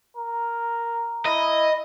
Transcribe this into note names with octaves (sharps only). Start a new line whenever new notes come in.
A#4
E4 D#5